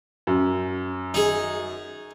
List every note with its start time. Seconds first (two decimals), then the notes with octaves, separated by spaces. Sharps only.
0.27 F#2
1.14 D#4 G#4